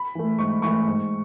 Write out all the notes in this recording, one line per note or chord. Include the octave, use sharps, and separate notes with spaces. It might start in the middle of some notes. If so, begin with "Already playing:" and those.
Already playing: B5
E3 A3
G#2 C#6
E3 A3 C#6
G#2